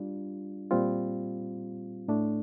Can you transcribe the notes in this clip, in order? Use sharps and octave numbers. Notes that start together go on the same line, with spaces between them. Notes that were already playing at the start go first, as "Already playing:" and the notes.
Already playing: G3 D4 F4
A#2 G3 C4 F4
A2 A3 D4